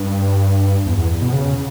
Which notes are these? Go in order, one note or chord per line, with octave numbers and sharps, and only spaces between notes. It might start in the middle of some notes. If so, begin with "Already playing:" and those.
Already playing: G2
E2
E2
B2
C#3